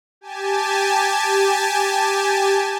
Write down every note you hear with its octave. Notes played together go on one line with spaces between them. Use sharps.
G4 G#5 A5